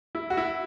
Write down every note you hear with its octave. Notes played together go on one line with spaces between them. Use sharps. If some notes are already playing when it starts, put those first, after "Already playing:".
E4
F#4
E4